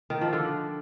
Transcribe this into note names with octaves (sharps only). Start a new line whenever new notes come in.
D#3
F3
D3